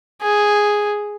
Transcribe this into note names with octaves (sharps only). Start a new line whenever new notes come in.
G#4